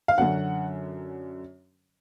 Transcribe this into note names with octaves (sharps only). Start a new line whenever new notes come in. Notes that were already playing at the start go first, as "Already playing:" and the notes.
F5
F#2 D3 F#3 C#4 F#5